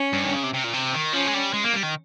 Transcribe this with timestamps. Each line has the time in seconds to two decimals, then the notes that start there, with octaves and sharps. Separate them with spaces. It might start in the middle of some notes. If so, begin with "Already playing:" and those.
Already playing: C#4
0.13 G2
0.24 D#3
0.33 C#3
0.43 C3
0.53 C3
0.64 A#2
0.73 C3
0.93 D#3
1.13 F3 C#4
1.27 G#3
1.34 G3
1.53 G#3
1.64 A#3
1.73 G3
1.83 D#3